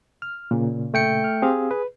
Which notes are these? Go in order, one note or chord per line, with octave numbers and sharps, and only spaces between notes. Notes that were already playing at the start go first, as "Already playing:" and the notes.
F6
A#2 C#3
A3 G5 C#7
F6
C4 G4 G#4 F5
B4